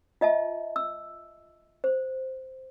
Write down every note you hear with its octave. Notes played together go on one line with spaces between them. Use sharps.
F4 D#5 E5 A5
E6
C5